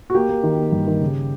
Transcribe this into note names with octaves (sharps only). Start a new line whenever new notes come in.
F#4
A#3 G4
A#3
D#3
A#3
G2
D#3
C#3